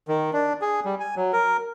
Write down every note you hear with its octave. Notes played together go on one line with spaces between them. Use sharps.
D#3
D4
G#4
G3
G#5
F#3
A#4